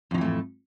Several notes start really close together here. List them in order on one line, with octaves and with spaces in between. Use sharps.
F2 D#3 E3 A3 A2